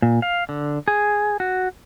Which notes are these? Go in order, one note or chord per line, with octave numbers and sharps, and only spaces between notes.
A#2
F5
D3
G#4
F#4